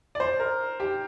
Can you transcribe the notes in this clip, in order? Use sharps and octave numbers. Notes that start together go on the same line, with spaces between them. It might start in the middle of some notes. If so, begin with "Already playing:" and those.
D5
C5
A#4
G4